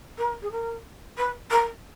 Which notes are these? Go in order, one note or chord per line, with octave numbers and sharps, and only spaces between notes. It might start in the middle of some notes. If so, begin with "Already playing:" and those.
A#4
G#4
A#4
B4
A#4